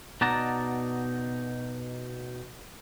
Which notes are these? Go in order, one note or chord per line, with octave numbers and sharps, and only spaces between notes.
B2 D#4 D5 F#5 A5 A#5